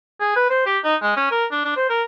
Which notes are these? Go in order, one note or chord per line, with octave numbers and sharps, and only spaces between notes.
G#4
B4
C5
G4
D#4
G#3
C#4
A#4
D4
D4
C5
A#4